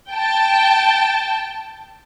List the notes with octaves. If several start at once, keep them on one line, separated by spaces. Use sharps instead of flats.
G5 A5